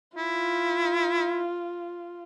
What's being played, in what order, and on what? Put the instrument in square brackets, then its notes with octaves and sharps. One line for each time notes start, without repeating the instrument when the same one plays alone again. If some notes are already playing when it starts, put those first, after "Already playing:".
[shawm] E4 [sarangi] F4